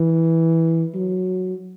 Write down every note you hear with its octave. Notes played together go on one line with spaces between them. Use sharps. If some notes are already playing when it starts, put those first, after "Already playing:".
Already playing: E3
F#3